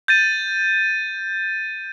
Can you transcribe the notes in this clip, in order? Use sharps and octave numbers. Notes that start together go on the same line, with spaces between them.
G6 A6 D#7